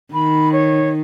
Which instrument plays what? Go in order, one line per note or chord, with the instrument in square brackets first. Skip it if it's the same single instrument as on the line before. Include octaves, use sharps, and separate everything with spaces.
[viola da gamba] D#3 [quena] B5
[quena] C#5